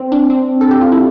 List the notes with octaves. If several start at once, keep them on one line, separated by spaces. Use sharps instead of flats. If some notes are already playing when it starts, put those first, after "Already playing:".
Already playing: C4
D4
C4
A4
G4
F4
E4